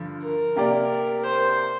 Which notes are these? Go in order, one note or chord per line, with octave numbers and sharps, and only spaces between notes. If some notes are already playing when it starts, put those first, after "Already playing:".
Already playing: G2 D3 F3
A#4
C3 A#3 G4 D5
C5